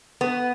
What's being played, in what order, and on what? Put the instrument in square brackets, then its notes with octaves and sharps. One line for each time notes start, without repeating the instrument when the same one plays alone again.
[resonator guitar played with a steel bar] B3